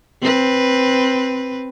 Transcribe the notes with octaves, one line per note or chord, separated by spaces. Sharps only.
C4 B4